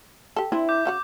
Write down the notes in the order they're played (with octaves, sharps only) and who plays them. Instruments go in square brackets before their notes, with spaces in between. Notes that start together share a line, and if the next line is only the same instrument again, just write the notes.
[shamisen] G4 A4
[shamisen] C4 D4 [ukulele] E4
[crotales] D6 G6
[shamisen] C#3 F#4 F#5